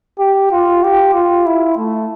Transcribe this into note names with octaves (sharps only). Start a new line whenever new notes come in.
G4
F4
G4
F4
E4
A3